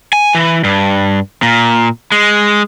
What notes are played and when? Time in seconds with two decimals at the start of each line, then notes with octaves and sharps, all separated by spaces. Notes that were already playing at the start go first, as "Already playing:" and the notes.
0.13 G#5
0.35 E3
0.64 G2
1.42 A#2
2.12 G#3